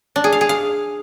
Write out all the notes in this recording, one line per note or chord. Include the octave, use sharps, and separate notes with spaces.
D4
G#4
F5
G#4
F5